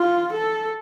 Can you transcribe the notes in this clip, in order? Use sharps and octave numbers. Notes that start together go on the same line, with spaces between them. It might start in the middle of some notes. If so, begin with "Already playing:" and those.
Already playing: F4
A4